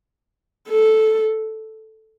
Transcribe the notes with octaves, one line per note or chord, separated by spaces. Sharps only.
A4